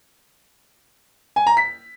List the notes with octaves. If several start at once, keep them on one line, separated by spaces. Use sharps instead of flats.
G#5
A#5
B6